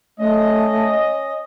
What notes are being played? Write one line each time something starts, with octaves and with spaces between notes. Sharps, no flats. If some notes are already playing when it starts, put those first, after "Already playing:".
A3 C#4 D#5